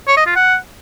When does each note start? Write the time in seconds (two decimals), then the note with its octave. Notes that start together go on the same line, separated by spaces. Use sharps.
0.07 C#5
0.17 D#5
0.26 F4
0.36 F#5